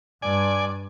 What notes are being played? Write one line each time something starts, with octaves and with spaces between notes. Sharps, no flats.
G2 D5 G#5